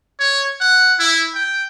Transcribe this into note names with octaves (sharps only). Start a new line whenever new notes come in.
C#5
F#5
E4
G5